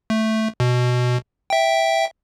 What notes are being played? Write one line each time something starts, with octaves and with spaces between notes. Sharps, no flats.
A3
B2
E5 G5